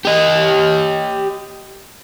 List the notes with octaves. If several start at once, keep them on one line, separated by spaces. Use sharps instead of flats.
G4 D#5